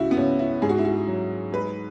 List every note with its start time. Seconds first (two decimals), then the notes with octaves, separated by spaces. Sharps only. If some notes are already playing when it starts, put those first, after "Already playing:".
Already playing: C#2 E4 F#4
0.11 B3
0.16 C#2 C#4
0.39 E4
0.62 G#2 G#4
0.69 F#4
0.78 E4
0.85 F#4
1.07 F#3
1.52 G#3 B4